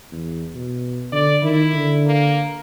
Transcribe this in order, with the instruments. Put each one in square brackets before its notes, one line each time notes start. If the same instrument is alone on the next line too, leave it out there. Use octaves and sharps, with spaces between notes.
[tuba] E2
B2
[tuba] D3 [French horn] D5
[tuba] D#3 [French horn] E4
[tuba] D3
[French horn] A#3